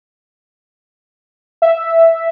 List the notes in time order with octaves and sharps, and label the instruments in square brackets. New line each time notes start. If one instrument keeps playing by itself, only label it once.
[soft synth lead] E5